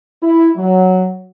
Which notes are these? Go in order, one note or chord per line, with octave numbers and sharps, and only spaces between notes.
E4
F#3